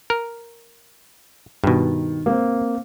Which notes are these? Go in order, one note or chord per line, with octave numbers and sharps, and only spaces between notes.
A#4
G2 B2 D#3
A#3 C4